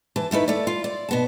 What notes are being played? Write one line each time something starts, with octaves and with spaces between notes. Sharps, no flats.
E3 A5
D#3 A3 E4 B4
A3 D5
F4
D5
B2 B3 A5